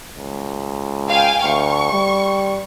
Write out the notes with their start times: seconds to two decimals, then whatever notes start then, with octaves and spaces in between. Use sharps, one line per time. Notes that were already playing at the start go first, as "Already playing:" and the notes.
0.18 C#2
1.09 F5 G5 G#5
1.44 D2 C#6
1.92 G3